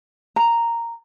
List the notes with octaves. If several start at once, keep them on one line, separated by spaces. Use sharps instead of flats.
A#5